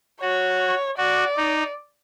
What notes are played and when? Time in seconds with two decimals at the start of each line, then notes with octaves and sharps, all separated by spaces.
0.22 F#4 C#5
0.98 F#4 D5
1.37 D#4